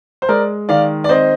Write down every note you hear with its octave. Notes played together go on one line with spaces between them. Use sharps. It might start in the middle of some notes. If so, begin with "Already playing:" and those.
C5
G#3 A#4 D5
D#3 D5 F5
D5
C4 C5 D#5